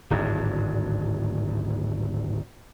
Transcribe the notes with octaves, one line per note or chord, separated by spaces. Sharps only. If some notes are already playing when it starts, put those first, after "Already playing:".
D1 G#1 G2